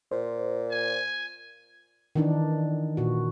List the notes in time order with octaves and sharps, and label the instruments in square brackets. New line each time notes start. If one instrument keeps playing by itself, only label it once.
[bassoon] A#2 [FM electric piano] C5
[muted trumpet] G#5
[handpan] D#3 E3 D4 D#4
A#2 F#4